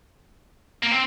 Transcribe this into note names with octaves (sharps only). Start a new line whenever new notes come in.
A#3
C4